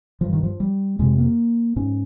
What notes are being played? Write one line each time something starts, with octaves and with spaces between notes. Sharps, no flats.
G2 F3
D#3
F3
G3
F2 C3 G#3
A#3
G#2 C#4